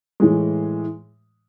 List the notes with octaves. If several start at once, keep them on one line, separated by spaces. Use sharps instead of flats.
A2 E3 G#3